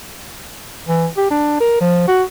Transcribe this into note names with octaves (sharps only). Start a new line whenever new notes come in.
E3
G4
D4
A#4
F3
F#4